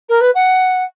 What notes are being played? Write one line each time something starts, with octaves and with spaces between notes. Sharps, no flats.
A#4
B4
F#5